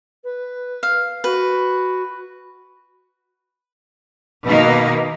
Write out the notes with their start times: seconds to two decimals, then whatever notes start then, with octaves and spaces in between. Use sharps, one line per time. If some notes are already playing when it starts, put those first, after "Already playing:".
0.24 B4
0.83 F5
1.24 F#4 B4
4.45 B2 D#3 A#3 D#4